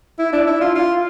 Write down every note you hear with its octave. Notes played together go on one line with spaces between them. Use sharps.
E4
D4
E4
F4
F4